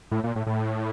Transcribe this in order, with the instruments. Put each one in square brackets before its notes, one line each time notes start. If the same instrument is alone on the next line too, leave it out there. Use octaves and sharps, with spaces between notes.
[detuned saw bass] A2
A#2
A2
A2